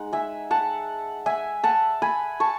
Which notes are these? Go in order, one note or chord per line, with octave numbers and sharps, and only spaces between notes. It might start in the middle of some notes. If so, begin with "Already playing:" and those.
Already playing: G#3 D#4 F#5
E5 G#5
F#5 A5
E5 G#5
F#5 A5
G#5 B5
A5 C#6